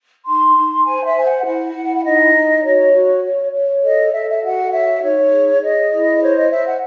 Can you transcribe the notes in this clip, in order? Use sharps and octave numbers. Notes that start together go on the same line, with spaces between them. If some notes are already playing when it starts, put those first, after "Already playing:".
D#4 C6
D#4
C5 G#5
E5
C5 G#5
F#5
E4 F#5
E4
D#4 D#5
D#4
F#4 C#5
F#4
C#5
C#5
A4 D#5
A4 E5
E5
F#4 F#5
C#5 E5
D#5
D#4 C#5
G#4
G#4 D#5
E4
C5 C#5
D#5
C5 E5
F#5